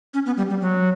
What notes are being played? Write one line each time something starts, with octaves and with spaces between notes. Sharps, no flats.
C#4
B3
G3
G3
F#3